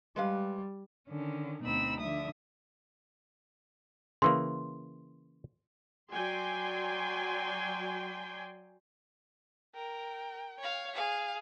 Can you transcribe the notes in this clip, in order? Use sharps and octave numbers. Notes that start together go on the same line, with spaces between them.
G3 G#3 B4 F5
D3 D#3 C#4
D2 B2 C4 D#4 B5 E6
D3 F3 E5 D#6
C#3 E3 A#3 C6
F#3 D5 G5 G#5 C6
A#4 G5
C#5 F5
G#4 F5